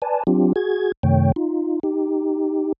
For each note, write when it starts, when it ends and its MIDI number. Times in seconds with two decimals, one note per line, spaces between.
0.02 0.23 71
0.02 0.23 74
0.02 0.23 80
0.02 0.23 81
0.27 0.53 54
0.27 0.53 60
0.27 0.53 62
0.27 0.53 65
0.27 0.53 67
0.56 0.92 66
0.56 0.92 68
0.56 0.92 92
1.03 1.32 42
1.03 1.32 48
1.03 1.32 51
1.03 1.32 57
1.03 1.32 73
1.03 1.32 79
1.36 1.80 63
1.36 1.80 65
1.83 2.72 63
1.83 2.72 67